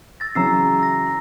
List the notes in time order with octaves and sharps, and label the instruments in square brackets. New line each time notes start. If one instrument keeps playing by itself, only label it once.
[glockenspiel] E6 A6 A#6
[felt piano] C#3 E3 F#3 [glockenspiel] A#5 E6 C7
[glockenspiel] E6 A#6